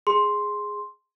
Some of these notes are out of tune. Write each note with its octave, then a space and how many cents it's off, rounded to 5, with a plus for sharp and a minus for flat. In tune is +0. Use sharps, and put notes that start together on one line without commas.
G#4 +0 C6 +0